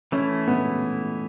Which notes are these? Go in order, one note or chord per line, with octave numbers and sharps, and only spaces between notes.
E3 A3 C#4 E4
B3